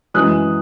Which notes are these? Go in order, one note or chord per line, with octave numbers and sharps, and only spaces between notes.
F#2 E3 G#3 D#6 F#6